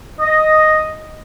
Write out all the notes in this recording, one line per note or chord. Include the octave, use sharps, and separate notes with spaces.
D#5